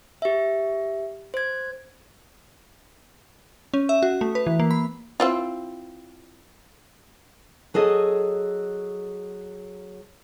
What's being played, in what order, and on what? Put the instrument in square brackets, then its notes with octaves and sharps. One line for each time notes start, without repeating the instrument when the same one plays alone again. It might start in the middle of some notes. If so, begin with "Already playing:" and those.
[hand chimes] G4 E5
C5 G#6
[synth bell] C#4
E5
F#4
A3
B4
E3
A#3
B5
[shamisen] C4 E4 F4
[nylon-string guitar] F#3 G#4 A4 D#5